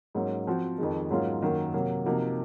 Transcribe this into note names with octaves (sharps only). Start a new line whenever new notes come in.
G#2 F#3 A#3 C#4
F3 C4 F#4
F2 D#3 G#3
G#2 F#3 A#3 C#4 F4
F#2 D#3 F#3 A#3
C3 F#3 A#3
C3 F3 A#3 D#4 F#4